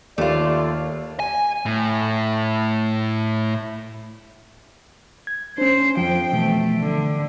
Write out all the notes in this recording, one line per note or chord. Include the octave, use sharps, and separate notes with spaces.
D#2 A3 F4 D5
G#5
A2
G#6
C#4 D4 C5
F2 F3 G5
B2 E3 F3 A3
D3